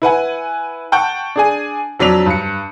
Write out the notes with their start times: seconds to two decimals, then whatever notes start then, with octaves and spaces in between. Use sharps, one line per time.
0.02 E4 B4 F#5 G#5
0.92 F#5 G5 A5 C#6 G6
1.36 D4 G#4 G#5
1.99 F2 F#3 D4 B6 F7
2.26 G2 C#7